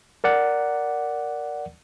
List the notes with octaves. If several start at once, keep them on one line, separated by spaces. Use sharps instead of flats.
A#4 D5 F#5